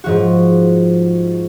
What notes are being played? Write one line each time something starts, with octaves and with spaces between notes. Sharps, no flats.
G#2 F3 F#4